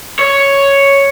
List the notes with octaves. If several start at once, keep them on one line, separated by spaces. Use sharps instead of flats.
C#5